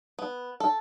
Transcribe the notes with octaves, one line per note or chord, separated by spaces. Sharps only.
B3
A4